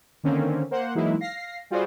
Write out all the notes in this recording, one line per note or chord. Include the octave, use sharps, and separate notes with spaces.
D3 D#3 A#3 C4 C#4
A#3 C5 F#5
E3 F#3 G#3 A#3 D#4 E4
F5 A#6 C7
G3 F4 F#4 G#4 C5 D5